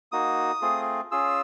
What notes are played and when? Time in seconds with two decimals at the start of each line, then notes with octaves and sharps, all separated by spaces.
0.12 A#3 D#4 F#4 D#6
0.62 A3 C4 F4 G#4
1.11 C#4 F4 G#4 E6